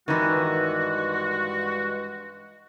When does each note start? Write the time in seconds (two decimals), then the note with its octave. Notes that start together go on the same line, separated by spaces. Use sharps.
0.08 G2 D#3 E3 G#3 F#4